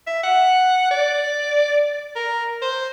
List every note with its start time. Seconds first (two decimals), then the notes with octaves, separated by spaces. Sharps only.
0.07 E5
0.23 F#5
0.91 D5
2.16 A#4
2.62 C5